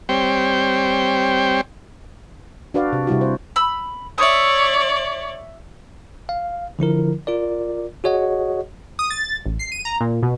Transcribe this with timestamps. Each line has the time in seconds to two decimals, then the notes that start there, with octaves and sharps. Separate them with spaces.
0.09 G3 C4 C5 C#5 G5
2.74 D4 F#4 B4 D5 F5
2.93 C3
3.07 C3 G3 E4 F#4
3.21 C5
3.56 B5 E6
4.18 C#5 D5 E5 D#6
6.29 F5
6.79 D3 F3 E4 A#4
7.27 F4 A#4 D5
8.04 F#4 G#4 C#5 D#5 F#5
8.99 D#6
9.10 A6
9.46 A1
9.59 C7
9.72 D#7
9.85 A#5
10.01 A#2
10.23 B2